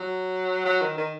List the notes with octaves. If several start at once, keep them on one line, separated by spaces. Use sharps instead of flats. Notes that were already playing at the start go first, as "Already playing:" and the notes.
Already playing: F#3
F#3
D#3
D#3